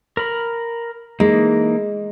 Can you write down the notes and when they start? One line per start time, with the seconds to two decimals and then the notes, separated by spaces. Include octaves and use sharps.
0.17 A#4 B5
1.20 E3 G#3 A#3 D#4